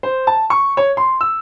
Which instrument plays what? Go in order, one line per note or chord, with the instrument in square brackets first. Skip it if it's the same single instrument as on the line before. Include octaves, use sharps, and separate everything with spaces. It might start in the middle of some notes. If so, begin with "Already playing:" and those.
[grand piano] C5
A5
C#6
C#5
C6
E6